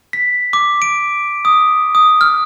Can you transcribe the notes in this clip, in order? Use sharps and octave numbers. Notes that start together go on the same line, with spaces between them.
B6
D6
D7
D#6
D#6
F6